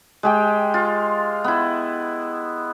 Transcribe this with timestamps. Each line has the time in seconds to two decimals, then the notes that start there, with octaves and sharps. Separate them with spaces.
0.23 G#3 G4 G5
0.74 F4
1.44 B3 E4